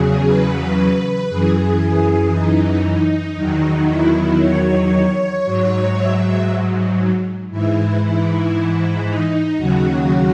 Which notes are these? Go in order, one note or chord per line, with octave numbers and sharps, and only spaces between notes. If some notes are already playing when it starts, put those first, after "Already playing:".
Already playing: E2 C#3 F#3 G#4
B4
F#2 E3 G#4
D#4
D#4
E2 D#3 F#3
E4
C#5
G#2 F#3
E5
G#2 E3 E4
E4
D#4
D#2 C#3 F#3 F#4